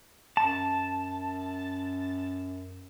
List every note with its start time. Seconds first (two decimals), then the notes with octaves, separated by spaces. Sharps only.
0.37 F#2 A5